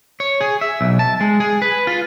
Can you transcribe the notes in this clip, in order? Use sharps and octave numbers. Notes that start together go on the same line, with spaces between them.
C#5
G#4
E5
B1
A5
G#3
G#4
B4
F4